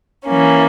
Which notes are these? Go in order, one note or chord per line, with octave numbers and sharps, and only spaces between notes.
E3 A#3 C#4